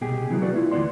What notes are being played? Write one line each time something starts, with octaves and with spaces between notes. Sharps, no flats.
C2 B2 G4 G#4
C3 E3 F#3 G#3 B3
F#4 A4 B4 D5
A3 E4 F4
D2 E3 F#3 B3 D5 C6